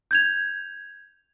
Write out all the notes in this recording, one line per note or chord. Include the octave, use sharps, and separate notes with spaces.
G6 G#6 F7